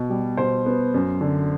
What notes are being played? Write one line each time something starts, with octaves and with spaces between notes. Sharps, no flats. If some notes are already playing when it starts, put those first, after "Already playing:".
Already playing: B2
G3
B2 C5
B3
F#2
D3